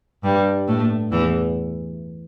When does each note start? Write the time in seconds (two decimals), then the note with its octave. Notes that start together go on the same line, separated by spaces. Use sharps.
0.24 G2 G3
0.68 A2 A3
1.11 E2 E3